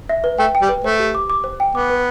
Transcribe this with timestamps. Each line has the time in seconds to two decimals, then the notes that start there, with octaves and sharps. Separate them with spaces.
0.09 E5
0.24 B4
0.38 A3 G5
0.55 G5
0.62 G3
0.69 B4
0.84 A3 C5
1.00 G4
1.15 D6
1.30 D6
1.44 C5
1.60 G5
1.75 B3 D6
1.90 B4